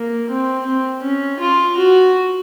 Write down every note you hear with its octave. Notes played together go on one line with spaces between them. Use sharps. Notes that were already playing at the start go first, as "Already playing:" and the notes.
Already playing: A#3
C4
C4
C#4
F4
F#4